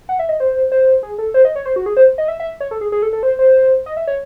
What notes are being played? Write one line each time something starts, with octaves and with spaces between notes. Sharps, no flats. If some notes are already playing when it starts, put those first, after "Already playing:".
F#5
E5
D#5
C5
C5
G#4
A4
C5
D#5
C#5
C5
F#4
G#4
C5
D#5
E5
E5
C#5
A4
G#4
G#4
A4
A4
C5
C5
D#5
E5
C#5